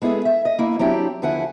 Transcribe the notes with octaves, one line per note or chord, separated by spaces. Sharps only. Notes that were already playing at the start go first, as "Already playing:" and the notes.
G#3 B3 E4 G#4 A4
E5
D#5
A#3 E4
F#3 C4 D4 E4 G4
D#2 D3 F3 E4 F#5 G#5